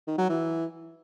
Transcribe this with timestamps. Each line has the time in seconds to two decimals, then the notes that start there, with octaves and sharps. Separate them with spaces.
0.07 D#3
0.18 F#3
0.29 E3